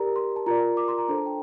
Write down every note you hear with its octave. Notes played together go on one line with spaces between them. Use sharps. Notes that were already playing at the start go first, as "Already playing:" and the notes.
Already playing: G4 A#4 D5 A#5
C6
A5
F4 A#4 D5 A#5
D6
C6
A#5
D4 A4 C5 A#5
A5
G5